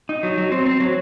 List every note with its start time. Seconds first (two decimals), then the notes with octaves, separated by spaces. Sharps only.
0.09 D#4
0.23 F#3
0.38 F#3
0.52 C4
0.65 C4
0.80 F#3